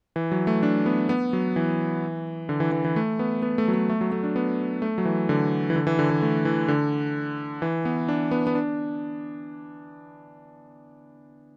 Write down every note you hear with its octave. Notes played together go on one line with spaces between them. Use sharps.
E3
F#3
A3
D4
B3
B3
F#3
E3
D3
E3
E3
E3
A3
B3
B3
A3
F#3
A3
A3
F#3
A3
D4
B3
A3
F#3
E3
D3
E3
D3
E3
D3
E3
A3
E3
D3
E3
B3
D4
B3
B3
D4